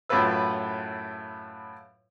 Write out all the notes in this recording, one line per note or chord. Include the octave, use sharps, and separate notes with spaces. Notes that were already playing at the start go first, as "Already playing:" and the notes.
F#2 A2 E4 F4 B4 E6